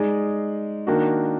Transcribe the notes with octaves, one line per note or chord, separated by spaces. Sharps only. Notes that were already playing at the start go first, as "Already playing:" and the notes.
Already playing: G#3 D#4 G#4 D5
D#3 A#3 D4 F#4